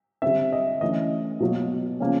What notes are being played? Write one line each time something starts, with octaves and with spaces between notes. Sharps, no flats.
D3 G3 C4 E5
D#5
E3 A3 C#4 D#5
B2 F#3 A#3
C#3 F3 A#3 C#4